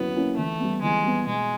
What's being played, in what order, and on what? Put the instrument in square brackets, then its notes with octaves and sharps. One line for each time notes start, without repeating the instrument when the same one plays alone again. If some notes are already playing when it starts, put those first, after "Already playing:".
Already playing: [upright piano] F#3 A#3 C#4 E4 [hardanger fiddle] B3
[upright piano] A#3 C#4 E4
[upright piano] E3 [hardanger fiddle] A3
[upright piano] G3 B3
[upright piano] E3 [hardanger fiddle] G#3
[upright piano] G3 B3
[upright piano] B2 [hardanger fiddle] G#3